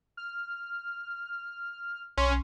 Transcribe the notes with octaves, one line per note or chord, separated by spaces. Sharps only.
F6
B1 C#4 C6